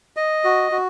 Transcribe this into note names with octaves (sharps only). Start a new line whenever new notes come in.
D#5
F#4
F#4